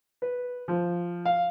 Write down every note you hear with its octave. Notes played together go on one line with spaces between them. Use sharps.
B4
F3
F5